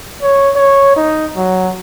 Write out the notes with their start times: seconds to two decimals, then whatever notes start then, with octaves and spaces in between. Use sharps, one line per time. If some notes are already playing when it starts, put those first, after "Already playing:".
0.23 C#5
0.56 C#5
0.96 D#4
1.37 F#3